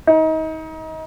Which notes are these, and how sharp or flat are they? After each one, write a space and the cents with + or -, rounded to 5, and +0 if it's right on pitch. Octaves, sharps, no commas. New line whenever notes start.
D#4 +30